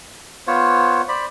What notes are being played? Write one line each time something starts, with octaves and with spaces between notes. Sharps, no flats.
B3 F4 C5 C#5
C5 D5 B5